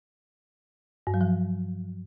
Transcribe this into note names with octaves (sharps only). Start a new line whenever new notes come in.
G2
F#3
F3